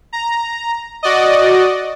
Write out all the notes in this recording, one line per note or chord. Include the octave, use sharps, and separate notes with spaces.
A#5
F#4 D5 D#5